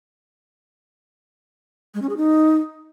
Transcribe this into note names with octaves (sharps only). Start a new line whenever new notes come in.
G#3
C#4
G#4
D#4